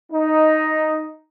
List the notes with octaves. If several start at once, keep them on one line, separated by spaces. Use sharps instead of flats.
D#4